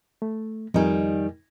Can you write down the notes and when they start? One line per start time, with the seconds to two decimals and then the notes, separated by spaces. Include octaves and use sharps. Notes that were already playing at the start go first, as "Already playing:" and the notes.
0.22 A3
0.74 F2 D#3 G3 D#4 G#5